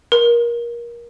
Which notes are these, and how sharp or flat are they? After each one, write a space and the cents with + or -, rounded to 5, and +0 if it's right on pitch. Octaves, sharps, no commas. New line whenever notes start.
A#4 +20